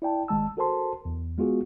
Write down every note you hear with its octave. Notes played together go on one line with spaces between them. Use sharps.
E4 D5 G5 A5
G1 D#3 G#3 A5 E6
F#4 A4 A#4 C5 A5 C6
E2
G#3 B3 F4 F#4 G#4